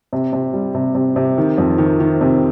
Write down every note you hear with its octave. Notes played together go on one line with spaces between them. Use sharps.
C3
C3
G3
C3
C3
C3
D#3
F2
D#3
D#3
C3